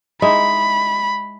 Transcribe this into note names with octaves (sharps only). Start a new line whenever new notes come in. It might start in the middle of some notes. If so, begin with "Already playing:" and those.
G#3 D#4 E4 B5